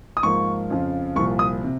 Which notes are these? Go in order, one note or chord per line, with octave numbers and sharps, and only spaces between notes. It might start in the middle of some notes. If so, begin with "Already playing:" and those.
D#6
G#2 F3 A#3 C#6
F2 C#3 F3
C2 A#2 F3 C#6
D#6
C3